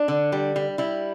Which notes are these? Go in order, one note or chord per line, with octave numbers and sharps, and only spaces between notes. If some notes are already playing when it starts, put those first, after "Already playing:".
Already playing: D4
D3
G3
G3
G3 E4